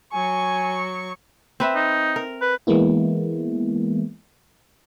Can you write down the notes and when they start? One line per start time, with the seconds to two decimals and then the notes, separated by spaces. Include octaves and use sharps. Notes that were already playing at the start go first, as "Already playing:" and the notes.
0.13 F#3 G#5 C#6
1.60 C4 B4 E5
1.75 D#4
2.16 A#4
2.42 B4
2.67 E3 G#3 A#3 B3 E4